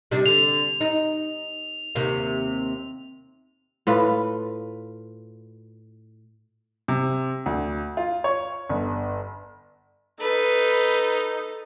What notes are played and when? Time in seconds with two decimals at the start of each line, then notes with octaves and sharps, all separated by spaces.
0.11 C3 G3 D4
0.26 D3 F7
0.81 D#4
1.95 D#2 C3 A#3
3.87 A2 F4 B4
6.88 C3
7.46 D2
7.97 F4
8.24 C#5
8.69 G1
10.20 D#4 A4 B4